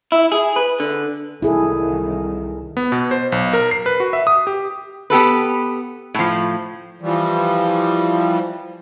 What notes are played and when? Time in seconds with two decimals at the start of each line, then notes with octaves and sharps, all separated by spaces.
0.12 E4
0.32 G#4
0.56 B4
0.80 D3
1.42 C2 D#3 E4 G#4 A4
2.77 B3
2.92 B2
3.11 C5
3.32 B1
3.53 A#4
3.71 C7
3.86 B4
4.00 F#4
4.13 E5
4.27 D#6
4.47 G4
5.10 B3 G4 A4 B4
6.14 A2 F3
7.02 E3 F3 G3